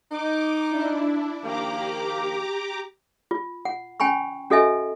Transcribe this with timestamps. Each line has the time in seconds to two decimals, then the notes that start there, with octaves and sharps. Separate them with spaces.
0.11 D#4 D6
0.69 D4 E4
1.42 D#3 F3 A#3 G4 A#5 D6
3.31 F4
3.65 F#5
4.00 C#4 G5 G#5 B5 C#6
4.50 C#4 F#4 A4 D#5 E5 G#5